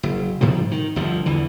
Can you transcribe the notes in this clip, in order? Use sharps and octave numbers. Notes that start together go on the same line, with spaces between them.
F#1
G#2 C3 F3 G3
D#3
G1 D2 F3
E2 D3 E3